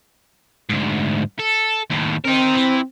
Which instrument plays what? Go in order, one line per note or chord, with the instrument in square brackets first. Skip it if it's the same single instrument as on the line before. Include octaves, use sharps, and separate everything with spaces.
[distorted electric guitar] D2 G#2
A4
D#2 A2
[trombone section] C4 [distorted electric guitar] D#4 A#4
[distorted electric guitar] E3